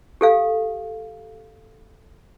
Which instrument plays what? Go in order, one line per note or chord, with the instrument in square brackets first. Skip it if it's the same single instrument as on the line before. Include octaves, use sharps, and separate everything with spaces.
[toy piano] G4 A4 F5